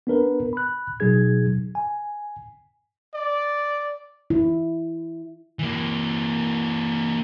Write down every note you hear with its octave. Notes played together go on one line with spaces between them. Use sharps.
B3 D4 A#4 B4
B5 F#6
B2 F#3 D#4 G#4 G#6
G#5
D5
E4
E3 A#3